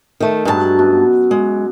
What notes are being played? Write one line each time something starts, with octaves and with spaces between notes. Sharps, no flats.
D#3 A3
G2 F#3 G#3 A4 A5
F#2 B2
G#3